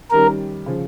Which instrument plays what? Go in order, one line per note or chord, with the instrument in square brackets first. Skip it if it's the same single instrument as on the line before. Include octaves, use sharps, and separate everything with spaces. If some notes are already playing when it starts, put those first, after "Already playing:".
[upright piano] D#3 G3 C#4 [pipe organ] A#4
[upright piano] C#3 F3